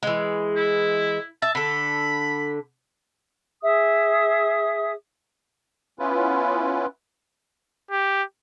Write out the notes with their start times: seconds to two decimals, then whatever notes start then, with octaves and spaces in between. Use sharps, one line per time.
0.03 E3 G#3
0.56 E4
1.42 E5 A5
1.55 D3 A4 B5
3.62 G#4 E5 D#6
5.99 B3 C#4 E4 F4 B4
7.91 G4